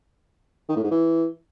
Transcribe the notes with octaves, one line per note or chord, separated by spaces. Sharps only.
D#3
A2
G#2
E3